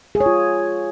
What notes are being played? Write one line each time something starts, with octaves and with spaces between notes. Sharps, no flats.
G#4
C#5
F4